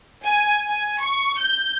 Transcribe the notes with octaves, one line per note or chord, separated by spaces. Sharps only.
G#5
G#5
C#6
G6